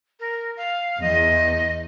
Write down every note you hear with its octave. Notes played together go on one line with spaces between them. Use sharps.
A#4
F5
E2 D#5